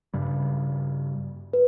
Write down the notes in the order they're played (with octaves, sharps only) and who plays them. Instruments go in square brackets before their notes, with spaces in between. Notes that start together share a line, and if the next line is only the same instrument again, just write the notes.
[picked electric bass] G2 C#3 G3
[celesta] B4